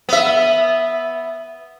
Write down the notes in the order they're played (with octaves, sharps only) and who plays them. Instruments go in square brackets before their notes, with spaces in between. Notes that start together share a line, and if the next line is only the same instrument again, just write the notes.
[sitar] B3 E5